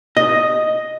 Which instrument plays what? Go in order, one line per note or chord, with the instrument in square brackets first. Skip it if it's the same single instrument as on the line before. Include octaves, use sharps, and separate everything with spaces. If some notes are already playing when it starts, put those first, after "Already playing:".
[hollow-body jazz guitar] D#5